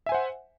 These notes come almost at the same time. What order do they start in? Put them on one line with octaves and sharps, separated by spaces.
E5 G#5 C5 F#5